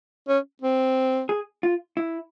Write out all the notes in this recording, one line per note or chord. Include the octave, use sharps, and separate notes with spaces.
C#4
C4
G#4
F4
E4